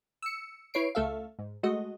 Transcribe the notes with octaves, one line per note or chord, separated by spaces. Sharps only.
E6 C#7
E4 B4 C#5 C7 D7
C#2 A3 A4 E5 F5
G#2
G#3 A3 F#4 D#5